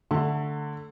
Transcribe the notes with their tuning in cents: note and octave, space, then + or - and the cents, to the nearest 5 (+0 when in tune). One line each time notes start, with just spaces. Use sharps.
D3 +0 A3 +0 A5 +40